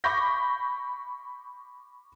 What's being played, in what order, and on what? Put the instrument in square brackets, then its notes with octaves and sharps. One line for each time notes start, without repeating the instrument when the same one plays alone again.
[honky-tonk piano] B5 C#6 D6 G6 A#6 B6